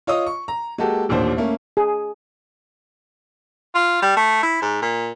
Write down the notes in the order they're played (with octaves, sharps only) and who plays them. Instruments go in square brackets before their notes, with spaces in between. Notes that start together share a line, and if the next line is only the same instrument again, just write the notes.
[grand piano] F4 C#5 D#5 D#6
C#6
A#5
G#3 A#3 F#4 G4 A4
A1 D#2 A#2 D4 C5
A3 A#3 C#4
[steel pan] G#4
[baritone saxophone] F4
G3
A3
E4
G#2
A#2